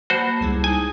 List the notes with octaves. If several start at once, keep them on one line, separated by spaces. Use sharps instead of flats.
A#3 F#4 C5 A5 B5
C#2 G3 G#3 E4 G#4
D#4 G#5